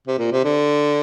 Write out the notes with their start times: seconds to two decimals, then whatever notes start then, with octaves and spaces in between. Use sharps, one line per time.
0.07 C3
0.18 A#2
0.32 C3
0.44 D3